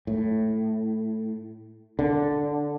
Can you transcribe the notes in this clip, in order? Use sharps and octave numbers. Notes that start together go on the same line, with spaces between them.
A2
D3